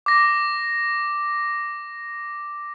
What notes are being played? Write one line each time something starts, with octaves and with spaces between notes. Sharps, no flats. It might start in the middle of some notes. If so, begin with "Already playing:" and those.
D6 A#6